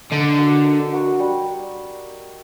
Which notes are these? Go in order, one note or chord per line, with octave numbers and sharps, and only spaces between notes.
D3 D#4
F#4 A#4
D#4
F#4 A#4
G3